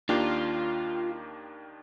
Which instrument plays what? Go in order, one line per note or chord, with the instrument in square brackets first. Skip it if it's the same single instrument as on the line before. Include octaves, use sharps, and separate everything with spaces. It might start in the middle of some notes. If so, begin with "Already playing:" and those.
[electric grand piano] D#2 D#3 A#3 D4 G4 [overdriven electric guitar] F4